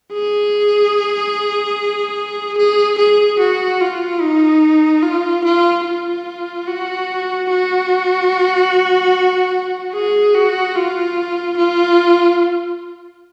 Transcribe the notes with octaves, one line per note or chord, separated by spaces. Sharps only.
G#4
G#4
G#4
F#4
F4
D#4
F4
F4
F4
F#4
F#4
G#4
F#4
F4
F4